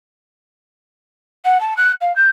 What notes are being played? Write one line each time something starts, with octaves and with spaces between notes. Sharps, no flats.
F#5
A5
F#6
F5
G6